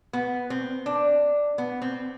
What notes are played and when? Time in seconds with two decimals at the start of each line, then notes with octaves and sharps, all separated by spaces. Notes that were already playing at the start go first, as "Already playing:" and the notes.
0.13 B3
0.50 C4
0.86 D4
1.58 B3
1.82 C4